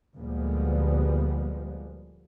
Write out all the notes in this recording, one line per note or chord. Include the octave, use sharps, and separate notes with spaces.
D2 A#2 F3 G3 G#3 B3